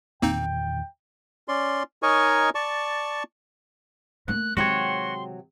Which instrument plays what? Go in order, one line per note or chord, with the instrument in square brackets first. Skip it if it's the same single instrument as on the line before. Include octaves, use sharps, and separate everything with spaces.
[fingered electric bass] E2 A#2 D#3 [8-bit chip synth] A#3 C4 D#4 [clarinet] G5
[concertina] C#4 D5 C6
D#4 A#4 C#5 D#5 G#5 C#6
D5 A5 C#6
[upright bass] A3 A#3 [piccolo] F#6
[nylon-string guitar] C3 F#3 G5 [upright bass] D#3 G#3 [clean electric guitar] F#4 C#5 [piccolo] C6